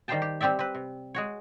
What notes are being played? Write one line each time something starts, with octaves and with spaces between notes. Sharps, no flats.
D#3 G3 C5 F5 G5 A5
G4
G3 C4 G4 D5 E5
C4 B4
C3
G#3 F#4 C#5